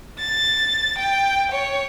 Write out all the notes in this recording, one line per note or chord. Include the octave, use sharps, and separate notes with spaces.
A6
G5
C#5